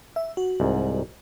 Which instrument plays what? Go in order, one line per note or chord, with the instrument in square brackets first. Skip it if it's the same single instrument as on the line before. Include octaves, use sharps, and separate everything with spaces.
[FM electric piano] E5
F#4
[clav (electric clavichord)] C2 G#2